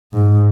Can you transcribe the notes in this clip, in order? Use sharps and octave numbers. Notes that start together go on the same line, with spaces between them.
G#2